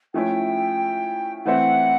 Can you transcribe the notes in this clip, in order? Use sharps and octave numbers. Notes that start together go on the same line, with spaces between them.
F3 A3 C#4 E4 G5
E3 A3 C4 E4 F#5